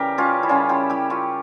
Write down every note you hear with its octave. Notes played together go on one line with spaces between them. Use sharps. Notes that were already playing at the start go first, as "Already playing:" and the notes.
Already playing: C#3 E3 G3 G4 A#4
C#4 F4
E4
C#3 G3 C#4 F4
E4 G4
E4 G4
C#4 F4